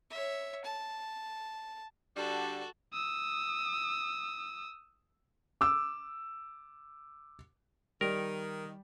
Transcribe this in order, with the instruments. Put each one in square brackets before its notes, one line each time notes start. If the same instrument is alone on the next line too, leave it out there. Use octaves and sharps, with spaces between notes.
[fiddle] C#5 E5
A5
[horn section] D3 G3 D4 [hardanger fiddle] F#4 A4
[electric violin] D#6 E6
[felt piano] D6 E6
[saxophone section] D#3 [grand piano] G3 [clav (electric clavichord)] A#4